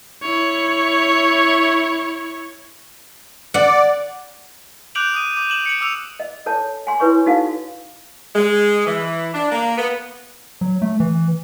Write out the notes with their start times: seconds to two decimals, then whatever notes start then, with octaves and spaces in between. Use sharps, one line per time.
0.23 E4 C#5
3.54 D5 F#5
4.95 D6 F#6 G6 D7 F7 F#7
5.14 D#6 D#7
5.36 D6
5.50 E7 F#7
5.66 C#7 D7 F#7
5.81 D6 E6 F7
6.20 D#5
6.46 A4 C#5 A5
6.87 G#5 C6
7.00 E4 B4 C#5 C#6
7.26 D#4 F#4 A4 F5
8.36 G#3
8.87 E3
9.34 D4
9.52 A#3
9.78 B3
10.61 F#3
10.82 A3
11.00 E3